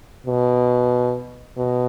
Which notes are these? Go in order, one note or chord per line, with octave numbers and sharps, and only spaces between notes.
B2
B2